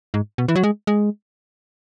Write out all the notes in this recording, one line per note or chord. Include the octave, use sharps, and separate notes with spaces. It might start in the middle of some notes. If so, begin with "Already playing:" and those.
G#2
B2
E3
F#3
G#3
G#3